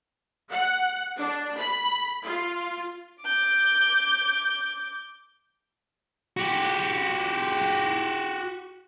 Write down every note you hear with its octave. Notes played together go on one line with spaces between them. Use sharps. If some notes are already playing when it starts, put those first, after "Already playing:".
F#5
D4
B5
F4
D6 G6
F#4 G4